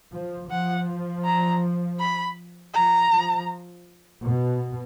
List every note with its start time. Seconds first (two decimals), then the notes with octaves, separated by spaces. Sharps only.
0.13 F3
0.49 F3 F#5
1.25 A#5
2.00 B5
2.74 F3 A#5
3.11 F3
4.23 B2